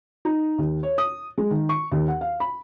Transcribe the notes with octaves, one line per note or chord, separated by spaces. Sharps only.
D#4
D#2
C#5
D#6
G#3
D#3
C#6
D#2
F#5
F5
B5